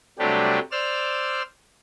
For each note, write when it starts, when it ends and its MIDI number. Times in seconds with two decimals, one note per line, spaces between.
0.19 0.59 48
0.19 0.59 54
0.19 0.59 55
0.19 0.59 57
0.19 0.59 62
0.19 0.59 67
0.72 1.42 72
0.72 1.42 74
0.72 1.42 88
0.72 1.42 89